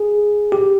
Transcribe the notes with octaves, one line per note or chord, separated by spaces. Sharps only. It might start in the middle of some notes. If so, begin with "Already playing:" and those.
Already playing: G#4
G4